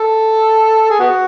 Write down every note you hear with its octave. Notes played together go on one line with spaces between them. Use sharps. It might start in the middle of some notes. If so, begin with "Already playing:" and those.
Already playing: A4
G#4
B3 F#4